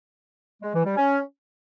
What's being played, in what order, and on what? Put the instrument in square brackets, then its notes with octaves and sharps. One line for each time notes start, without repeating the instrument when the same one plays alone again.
[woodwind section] G#3
E3
G3
C#4